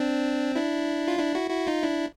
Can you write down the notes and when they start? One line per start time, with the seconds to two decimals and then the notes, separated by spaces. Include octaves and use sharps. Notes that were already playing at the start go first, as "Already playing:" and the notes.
Already playing: C4 D4
0.55 D4 E4
1.08 F4
1.19 D4 E4
1.35 E4 F#4
1.50 E4 F#4
1.67 D#4 F4
1.83 D4 E4